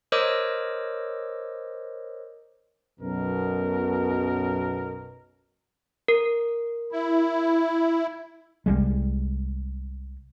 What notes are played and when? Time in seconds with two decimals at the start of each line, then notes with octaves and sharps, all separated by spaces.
0.12 A#4 C5 C#5 D#5 D6 E6
3.00 B1 F#2 B2 A#4
6.08 A#4
6.92 E4
8.66 C2 G3 G#3